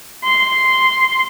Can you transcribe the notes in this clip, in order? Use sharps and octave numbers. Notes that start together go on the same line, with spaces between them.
C6